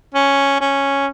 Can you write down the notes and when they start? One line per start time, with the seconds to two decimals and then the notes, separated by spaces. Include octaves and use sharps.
0.15 C#4
0.60 C#4